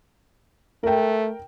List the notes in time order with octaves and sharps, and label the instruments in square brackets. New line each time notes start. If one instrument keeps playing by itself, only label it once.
[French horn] A3 [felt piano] A#4 G5